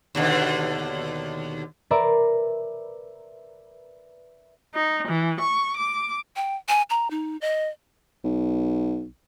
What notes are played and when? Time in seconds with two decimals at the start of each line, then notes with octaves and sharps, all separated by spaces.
0.15 D#2 B2 D3
1.91 A#4 B4 D5 E5 A#5 C6
4.74 D#4
5.08 E3
5.40 C#6
5.76 D6
6.36 G5
6.68 G#5
6.90 A#5
7.11 D#4
7.41 D#5
8.24 B1